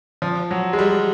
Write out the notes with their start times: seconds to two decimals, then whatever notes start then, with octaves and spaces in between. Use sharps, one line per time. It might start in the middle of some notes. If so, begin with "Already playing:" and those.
0.22 F3
0.51 F#3
0.73 G#3
0.79 G3